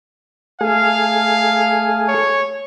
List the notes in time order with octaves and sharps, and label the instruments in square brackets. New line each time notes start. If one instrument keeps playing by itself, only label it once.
[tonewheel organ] A3 G#4 [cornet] F5
[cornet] C#5